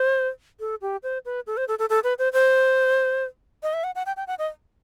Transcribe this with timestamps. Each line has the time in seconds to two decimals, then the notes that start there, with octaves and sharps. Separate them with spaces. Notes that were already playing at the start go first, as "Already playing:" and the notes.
Already playing: C5
0.60 A4
0.81 G4
1.03 C5
1.25 B4
1.47 A4
1.57 C5
1.68 A4
1.79 A4
1.89 A4
2.04 B4
2.18 C5
2.33 C5
3.63 D#5
3.73 E5
3.84 F#5
3.95 F#5
4.06 G5
4.16 G5
4.27 F#5
4.39 D#5